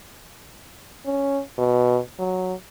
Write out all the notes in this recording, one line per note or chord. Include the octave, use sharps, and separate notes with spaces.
C#4
B2
F#3